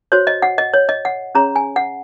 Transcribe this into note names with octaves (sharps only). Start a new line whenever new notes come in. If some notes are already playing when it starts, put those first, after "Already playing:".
F#4 C5 C#5
D#5
F#5
D#5
C#5
D#5
F#5
C#4 G#4 C#5 A#5
G#5
F#5